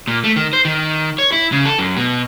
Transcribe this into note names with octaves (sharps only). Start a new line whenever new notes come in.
A#2
A3
D#3
C5
D#3
C#5
E4
C#3
A4
F#2
B2